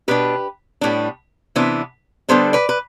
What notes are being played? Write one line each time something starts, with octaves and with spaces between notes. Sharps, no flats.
B2 B3 D4 G4 B4
A2 G3 B3 D4
C3 E3 B3 D4
D3 G3 B3 D4 A4 C5
B4 D5
B4